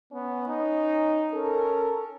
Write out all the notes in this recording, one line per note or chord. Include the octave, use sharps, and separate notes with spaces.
B3 C#4
D#4
C#4 A4 A#4